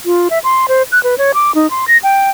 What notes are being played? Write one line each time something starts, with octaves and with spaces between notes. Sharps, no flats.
F4
E5
C6
C5
F#6
B4
C#5
D6
D#4
C6
A#6
G5